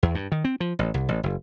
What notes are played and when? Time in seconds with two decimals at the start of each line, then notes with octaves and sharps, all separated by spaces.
0.03 E2
0.15 G2
0.32 D#3
0.44 C4
0.60 F3
0.79 A1
0.94 C2
1.09 A1
1.23 F#1